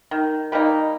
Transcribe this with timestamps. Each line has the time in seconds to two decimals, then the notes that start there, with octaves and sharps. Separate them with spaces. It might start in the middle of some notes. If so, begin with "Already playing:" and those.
0.11 D#3
0.52 G3 A#3 D#4